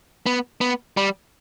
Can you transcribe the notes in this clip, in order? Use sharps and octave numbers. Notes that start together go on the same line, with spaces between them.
B3
B3
G3